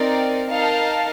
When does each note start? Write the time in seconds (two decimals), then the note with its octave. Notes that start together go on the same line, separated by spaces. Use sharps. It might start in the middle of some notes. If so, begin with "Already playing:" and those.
Already playing: C4 D#4 A#4 D5
0.50 D#4 A#4 F5 A5